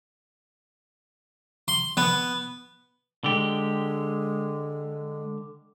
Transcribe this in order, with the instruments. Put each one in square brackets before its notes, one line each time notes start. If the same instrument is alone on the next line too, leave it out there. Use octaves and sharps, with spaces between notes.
[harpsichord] C6
B3
[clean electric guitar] D3 G4 [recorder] G#3